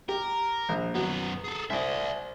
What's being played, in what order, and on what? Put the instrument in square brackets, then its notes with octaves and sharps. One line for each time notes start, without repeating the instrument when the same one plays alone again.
[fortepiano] G4 [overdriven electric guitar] A#4
[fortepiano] A#1
[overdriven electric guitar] F#2 B3 [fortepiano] F#3
[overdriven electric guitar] G#4 A4
[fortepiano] C2 [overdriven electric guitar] D5 E5